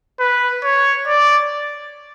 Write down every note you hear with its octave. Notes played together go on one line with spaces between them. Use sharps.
B4
C#5
D5